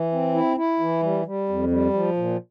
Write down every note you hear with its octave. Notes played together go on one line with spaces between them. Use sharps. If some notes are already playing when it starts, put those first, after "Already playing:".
Already playing: E3
C4
E4
E4
E3
G3
G3
F2
G3
F3
A#2